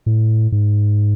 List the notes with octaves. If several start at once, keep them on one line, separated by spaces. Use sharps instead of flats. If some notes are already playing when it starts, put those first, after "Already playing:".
A2
G#2